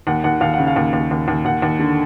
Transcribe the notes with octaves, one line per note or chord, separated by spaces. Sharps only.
D#2 F#5
D#2 F#5
D#2 F5
F#5
C#3
F5
D#2
D#2
D#2
D#2
D#2 F#5
D#2
D3